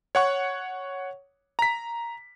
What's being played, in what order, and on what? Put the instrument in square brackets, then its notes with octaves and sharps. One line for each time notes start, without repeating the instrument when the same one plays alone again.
[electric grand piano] C#5 F#5 C#6
A#5 B6